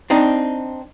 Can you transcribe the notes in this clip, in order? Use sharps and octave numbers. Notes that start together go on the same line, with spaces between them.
C4 D4 D#4